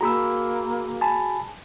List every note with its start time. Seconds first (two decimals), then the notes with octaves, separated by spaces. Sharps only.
0.01 A#3 F#4 G#4 A#5 B5 E6
1.01 G#5 A5 B5